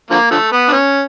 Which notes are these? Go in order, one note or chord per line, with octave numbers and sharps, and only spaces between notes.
D3 F3 A#3
D3 F3 A3
B3
D4
C#4